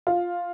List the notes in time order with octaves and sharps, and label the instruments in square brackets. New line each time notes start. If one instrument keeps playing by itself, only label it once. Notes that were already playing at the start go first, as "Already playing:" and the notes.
[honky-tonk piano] F4